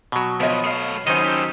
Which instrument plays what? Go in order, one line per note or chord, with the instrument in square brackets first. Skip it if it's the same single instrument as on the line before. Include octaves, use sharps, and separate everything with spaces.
[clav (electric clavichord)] B2 F#3
[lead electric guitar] F3 [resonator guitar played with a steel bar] B3 C#5 D#5
[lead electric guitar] A3 F5
[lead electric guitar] F#2 B2 [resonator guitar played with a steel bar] D#3 F#3 [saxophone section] C#4 D#4 C5 [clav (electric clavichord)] D#5
[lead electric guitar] G4 A4